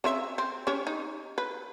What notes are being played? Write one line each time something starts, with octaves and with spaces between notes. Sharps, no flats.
C#3 C4 E5
C4
C#4 G4 C#5
D#4
B4